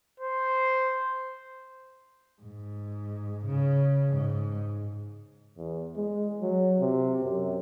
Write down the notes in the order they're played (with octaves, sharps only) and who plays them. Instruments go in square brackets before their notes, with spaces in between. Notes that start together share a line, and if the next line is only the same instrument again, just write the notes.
[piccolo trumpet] C5
[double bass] G#2
C#3
G#2
[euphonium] E2
G#3
F#3
C3
F#2